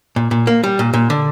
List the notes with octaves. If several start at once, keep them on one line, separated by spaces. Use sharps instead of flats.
A#2
A#2
A#3
G3
A#2
A#2
D3